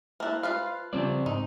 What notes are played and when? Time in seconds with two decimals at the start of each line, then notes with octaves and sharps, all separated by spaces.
0.20 A#3 E4 C5 A5 F#6
0.43 F4 B4 F5
0.93 C#3 F3 G3 C4 D5
1.26 G#2 D#4